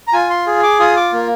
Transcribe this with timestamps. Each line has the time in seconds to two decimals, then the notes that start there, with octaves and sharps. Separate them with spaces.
0.08 A#5
0.13 F4 G#5
0.30 C6
0.47 G#4
0.63 D6
0.80 F4 D#6
0.96 D6
1.13 A#3